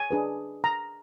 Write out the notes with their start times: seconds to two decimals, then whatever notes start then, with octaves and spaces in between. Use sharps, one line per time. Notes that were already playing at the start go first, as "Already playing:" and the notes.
Already playing: G#5
0.11 D4 G#4 B4
0.64 A#5